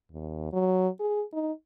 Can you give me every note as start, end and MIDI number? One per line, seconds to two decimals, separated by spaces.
0.12 0.49 39
0.53 0.88 54
1.00 1.23 68
1.33 1.51 63